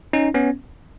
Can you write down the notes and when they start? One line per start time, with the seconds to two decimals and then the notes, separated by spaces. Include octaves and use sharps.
0.13 C#4 D#4
0.34 B3 C#4